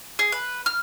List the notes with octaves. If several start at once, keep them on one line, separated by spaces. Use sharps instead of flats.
G#4
B4
F6